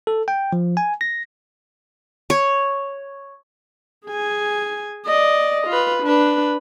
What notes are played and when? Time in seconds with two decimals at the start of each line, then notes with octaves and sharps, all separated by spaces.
0.07 A4
0.28 G5
0.53 F3
0.77 G#5
1.01 A#6
2.30 C#5
4.06 G#4 G#5
5.06 D5 D#5
5.67 F4 B4
6.03 D4 B4